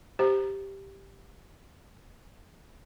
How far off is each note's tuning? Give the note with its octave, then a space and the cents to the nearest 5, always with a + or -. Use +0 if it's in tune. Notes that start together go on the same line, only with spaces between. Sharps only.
G4 +0 C5 +0 A#5 +0